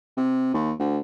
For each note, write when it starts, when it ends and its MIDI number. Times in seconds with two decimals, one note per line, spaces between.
0.17 0.51 48
0.54 0.72 39
0.80 0.99 38